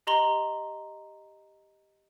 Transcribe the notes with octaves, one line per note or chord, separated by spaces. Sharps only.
G4 D#5 A#5 C6 F#7 G7